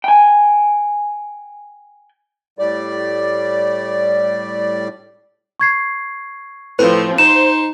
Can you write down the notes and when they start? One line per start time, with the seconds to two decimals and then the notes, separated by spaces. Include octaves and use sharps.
0.04 G5 G#5
2.59 A2 G3 D5
5.60 C#6 G#6 C7
6.79 A2 F3 C4 B4
7.18 D#4 C5 E7